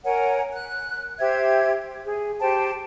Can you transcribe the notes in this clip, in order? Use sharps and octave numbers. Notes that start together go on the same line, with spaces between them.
A#4 C#5 F#5 G#5
F#6
G4 C5 E5 G#6
G#4
G4 C5 G5 A5